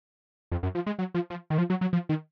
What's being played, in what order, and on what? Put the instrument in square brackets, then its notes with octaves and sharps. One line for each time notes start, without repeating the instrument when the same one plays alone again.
[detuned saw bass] F2
F#2
F3
G#3
F#3
F3
F3
D#3
F3
F#3
F#3
F3
D#3